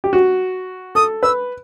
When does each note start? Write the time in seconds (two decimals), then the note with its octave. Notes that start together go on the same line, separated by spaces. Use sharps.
0.04 G4
0.13 F#4
0.95 A4 D#6
1.23 B4 E6